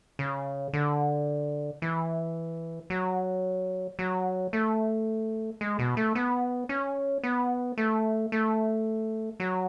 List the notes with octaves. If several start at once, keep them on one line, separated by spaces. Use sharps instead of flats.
C#3
D3
E3
F#3
F#3
A3
G#3
B2
A3
B3
C#4
B3
A3
A3
F#3